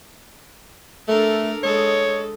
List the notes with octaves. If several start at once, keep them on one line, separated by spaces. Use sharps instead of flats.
A3 D4 A4 A#4
G#3 A4 C#5 D#5